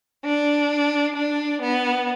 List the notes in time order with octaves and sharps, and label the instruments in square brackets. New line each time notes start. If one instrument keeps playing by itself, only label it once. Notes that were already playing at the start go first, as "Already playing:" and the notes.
[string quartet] D4
D4
B3